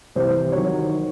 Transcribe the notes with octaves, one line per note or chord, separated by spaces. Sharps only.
C2 C3 E3 G3 C5
D#3 F#3 C#5